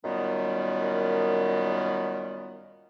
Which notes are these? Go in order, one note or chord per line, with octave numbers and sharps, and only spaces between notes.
F#2 A#2 D#3 G3 B3